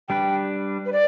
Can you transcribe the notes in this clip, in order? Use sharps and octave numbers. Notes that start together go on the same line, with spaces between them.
G3 D4 B4 G5
B4
D5